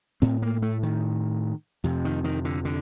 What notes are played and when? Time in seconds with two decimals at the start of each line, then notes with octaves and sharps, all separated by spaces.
0.22 A2 C4
0.42 A#3
0.62 A3
0.83 D#3
1.84 F2 C3
2.05 D#3
2.24 D#3
2.45 D3
2.65 D3